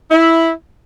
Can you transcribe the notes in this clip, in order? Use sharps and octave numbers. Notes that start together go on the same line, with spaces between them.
E4